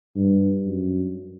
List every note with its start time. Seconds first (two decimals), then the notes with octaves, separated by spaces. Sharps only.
0.16 G2
0.66 F#2